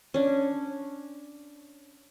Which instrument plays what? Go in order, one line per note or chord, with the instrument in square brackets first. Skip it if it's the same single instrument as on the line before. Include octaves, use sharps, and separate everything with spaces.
[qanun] C#4 D4